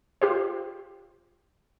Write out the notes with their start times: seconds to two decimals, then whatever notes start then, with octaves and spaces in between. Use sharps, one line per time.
0.22 F4 G4 C5